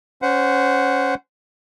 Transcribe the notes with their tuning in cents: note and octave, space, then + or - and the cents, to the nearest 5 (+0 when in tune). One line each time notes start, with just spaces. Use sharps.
C#4 +0 C5 -20 F#5 +0